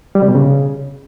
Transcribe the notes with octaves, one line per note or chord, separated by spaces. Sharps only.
G3
C3
B2
C#3